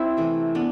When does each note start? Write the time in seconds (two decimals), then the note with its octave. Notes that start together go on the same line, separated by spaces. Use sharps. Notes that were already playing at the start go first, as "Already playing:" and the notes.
Already playing: C4 E4
0.17 C3 E3 A3
0.55 B3 D4